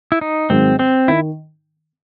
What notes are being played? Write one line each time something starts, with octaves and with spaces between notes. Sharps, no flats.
E4
D#4
G#2 D#3 F#3 C4
C4
D#3 E4